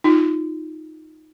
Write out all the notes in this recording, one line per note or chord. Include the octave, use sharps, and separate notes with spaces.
D#4 F4